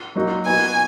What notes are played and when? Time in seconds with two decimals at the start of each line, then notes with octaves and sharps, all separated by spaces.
0.16 F#3 A#3 D#4 F#4
0.46 B3 D#4 F#4 G#5